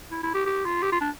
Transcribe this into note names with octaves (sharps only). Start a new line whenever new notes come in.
E4
E4
G4
G4
F4
G4
F4
D4